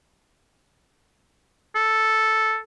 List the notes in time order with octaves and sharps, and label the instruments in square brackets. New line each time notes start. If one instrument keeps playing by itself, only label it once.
[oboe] A4